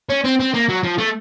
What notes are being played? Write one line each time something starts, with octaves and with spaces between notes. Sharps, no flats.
C#4
C4
C4
A#3
F#3
F3
A3